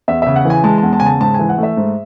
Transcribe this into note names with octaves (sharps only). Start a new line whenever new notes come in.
E2 E5
C#3 E5
F#5
E3
G#5
G#3 A5
E2 A5
A5
C#3 G#5
A5
G#2 A5
E3 G#5
F#5
A3 E5
G#2